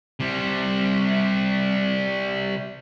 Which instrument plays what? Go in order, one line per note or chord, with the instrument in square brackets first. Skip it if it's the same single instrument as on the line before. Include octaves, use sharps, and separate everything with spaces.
[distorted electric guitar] C3 G3